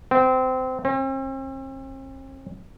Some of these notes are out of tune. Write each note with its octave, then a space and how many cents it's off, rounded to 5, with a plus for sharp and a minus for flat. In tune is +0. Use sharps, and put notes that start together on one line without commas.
C4 -20
C4 +45